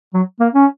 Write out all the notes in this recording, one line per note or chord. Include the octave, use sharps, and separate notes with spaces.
F#3
A#3
C#4